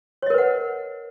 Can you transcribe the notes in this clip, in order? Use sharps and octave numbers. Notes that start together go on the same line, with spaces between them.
A#4 B4 C#5 D#5 F#5